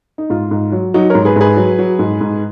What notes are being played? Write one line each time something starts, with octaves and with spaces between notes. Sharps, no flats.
D#4
G#2 F4
G#2
F#3
F#3 D#4 F#4
G#2 A#4 C#5
G#4 B4
G#2 G#4 B4
F#3
F#3
G#2
G#2